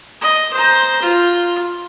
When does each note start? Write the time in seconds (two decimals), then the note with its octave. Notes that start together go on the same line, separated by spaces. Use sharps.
0.21 D#5
0.53 C5 A#5
1.02 F4